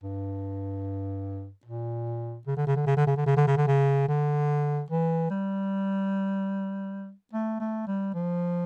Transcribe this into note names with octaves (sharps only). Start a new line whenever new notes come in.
G2
A#2
C#3
D3
C#3
D3
C#3
D3
C#3
D3
C#3
D3
C#3
D3
C#3
D3
E3
G3
A3
A3
G3
F3